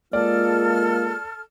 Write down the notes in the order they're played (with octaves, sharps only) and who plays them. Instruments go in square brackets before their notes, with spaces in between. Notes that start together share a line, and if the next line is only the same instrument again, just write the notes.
[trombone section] G#3 F4 [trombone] A#3 [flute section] A4 F6 [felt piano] D5